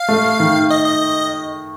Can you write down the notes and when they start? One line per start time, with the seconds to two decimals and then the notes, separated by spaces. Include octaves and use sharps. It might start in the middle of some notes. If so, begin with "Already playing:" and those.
Already playing: F5
0.08 A3
0.40 D#3
0.70 D#5
0.85 D#5